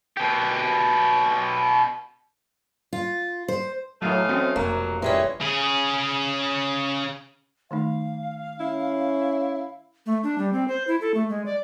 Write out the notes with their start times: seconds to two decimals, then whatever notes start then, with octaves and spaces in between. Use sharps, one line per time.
0.17 B2 G4
2.93 F4
3.48 C5
4.02 A2 E3 F#3 A3 D#4 F5
4.29 F#3 C4 C#4
4.56 F1 B2 F#3 A#3
5.02 A#2 E3 G3 G#3 C#4
5.41 C#3 G#4
7.71 D#3 A3 D#4 F5
8.60 C#4 E4
10.06 A3
10.23 D4
10.38 G3
10.53 C4
10.68 C5
10.87 E4
11.01 A4
11.14 A3
11.29 G#3
11.46 D5